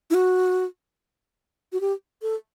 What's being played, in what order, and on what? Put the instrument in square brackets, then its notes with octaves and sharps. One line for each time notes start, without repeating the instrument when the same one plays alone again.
[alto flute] E4
F#4
F#4
G4
A4